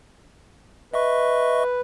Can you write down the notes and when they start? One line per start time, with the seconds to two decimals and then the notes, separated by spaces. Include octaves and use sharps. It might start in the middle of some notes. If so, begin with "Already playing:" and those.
0.94 B4 D#5 E5 C#6